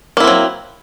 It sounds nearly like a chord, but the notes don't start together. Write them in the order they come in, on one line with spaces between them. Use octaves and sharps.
A#3 E4 C4 F#3